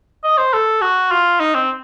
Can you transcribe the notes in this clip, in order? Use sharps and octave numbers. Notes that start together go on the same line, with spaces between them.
D#5
C5
A4
F#4
F4
D#4
C4